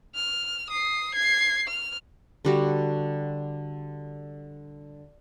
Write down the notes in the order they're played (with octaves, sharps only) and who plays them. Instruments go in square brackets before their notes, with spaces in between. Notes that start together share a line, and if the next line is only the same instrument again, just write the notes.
[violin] F6
D#6 C7
G#6 C7
F6
[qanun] D3 G3 F#4